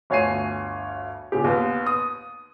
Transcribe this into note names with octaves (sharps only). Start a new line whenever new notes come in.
G1 D2 C#5 G#5 C7 D#7
A#2 C#3 G4
D#2 B3
D#6